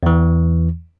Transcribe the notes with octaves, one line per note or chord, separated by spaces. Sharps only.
E2 E3